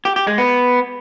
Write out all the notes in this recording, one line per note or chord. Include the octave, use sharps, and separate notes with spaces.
G4
G4
G#3
B3